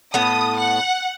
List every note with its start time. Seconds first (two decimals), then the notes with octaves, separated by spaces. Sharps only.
0.14 A2 B3 A4 D#6
0.57 F#5